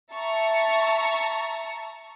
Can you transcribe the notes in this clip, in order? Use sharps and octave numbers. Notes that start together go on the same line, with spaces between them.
E5 A5 A#5 C#6